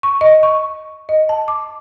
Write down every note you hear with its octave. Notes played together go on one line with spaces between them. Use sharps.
C#6
D#5
C#6
D#5
A5
D6